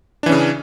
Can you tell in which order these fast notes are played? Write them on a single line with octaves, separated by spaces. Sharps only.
D4 E3 C#4 C#3